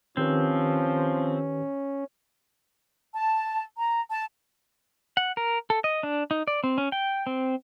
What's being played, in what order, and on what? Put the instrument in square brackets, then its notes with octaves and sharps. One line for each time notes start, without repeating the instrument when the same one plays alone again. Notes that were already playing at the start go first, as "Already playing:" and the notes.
[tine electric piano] D#3 G4 B4 [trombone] F3 [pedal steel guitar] C4 [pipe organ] C#4
[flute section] A5
A#5
A5
[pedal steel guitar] F#5
A#4
A4
D#5
D4
D#4
D5
C4
C#4
G5
C4